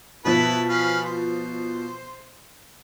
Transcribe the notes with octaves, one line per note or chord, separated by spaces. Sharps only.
B2 F3 E4 B4 A5
C#4 B4 F5
C5